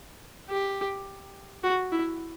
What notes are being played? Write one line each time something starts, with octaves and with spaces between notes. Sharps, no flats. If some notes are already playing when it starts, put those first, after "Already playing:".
G4
F#4
E4